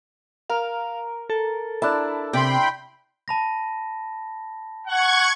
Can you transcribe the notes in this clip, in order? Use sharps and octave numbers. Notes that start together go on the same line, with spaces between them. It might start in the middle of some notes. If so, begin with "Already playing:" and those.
A#4 F5
A4
D4 E4 A5
C3 G5 B5 C6
A5 B5 A#6
F#5 C#6 G#6